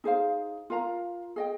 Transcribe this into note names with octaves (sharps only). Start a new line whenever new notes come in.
D#4 G#4 C5 F5
F4 A#4 F5 A#5
G#4 D#5 G5